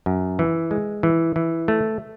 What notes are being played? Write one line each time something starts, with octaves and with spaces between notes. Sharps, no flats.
F#2
E3
G#3
E3
E3
A3